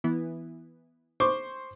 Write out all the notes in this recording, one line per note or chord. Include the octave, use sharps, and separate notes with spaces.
E3 B3 E4
C5 C#6 D6